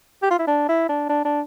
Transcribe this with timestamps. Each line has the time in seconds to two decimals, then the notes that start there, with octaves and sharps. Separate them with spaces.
0.23 G4
0.31 F4
0.39 E4
0.47 D4
0.69 E4
0.89 D4
1.09 D4
1.25 D4